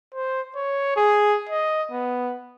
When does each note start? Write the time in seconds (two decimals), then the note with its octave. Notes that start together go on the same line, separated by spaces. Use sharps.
0.14 C5
0.56 C#5
0.97 G#4
1.49 D#5
1.92 B3